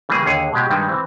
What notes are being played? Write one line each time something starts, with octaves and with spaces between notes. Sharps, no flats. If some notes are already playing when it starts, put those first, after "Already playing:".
C#3 E3 G3 A#3 G#4
D#2 D3 G#4 C#5
B2 G#3 G4
G2 D#3 G3 G#3
E3 C4